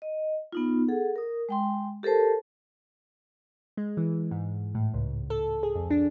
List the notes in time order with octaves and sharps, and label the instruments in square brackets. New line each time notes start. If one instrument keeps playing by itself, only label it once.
[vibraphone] D#5
B3 D#4 F4
G#4 A4 F#5
A#4 D#6
G#3 G5 C6
G4 A4 A#4 C5 A5
[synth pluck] G#3
E3
G#2
A2
C#2
A4
G#4
F2
D4